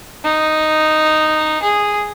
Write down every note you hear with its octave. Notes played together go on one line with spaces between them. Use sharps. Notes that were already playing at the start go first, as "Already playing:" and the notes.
D#4
G#4